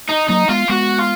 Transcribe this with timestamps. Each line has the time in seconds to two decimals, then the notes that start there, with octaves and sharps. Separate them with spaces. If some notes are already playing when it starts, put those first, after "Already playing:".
0.09 D#4
0.29 F#3 A#3 D#4
0.49 G#3 B3 F4
0.69 G#3 B3 F#4
0.99 F4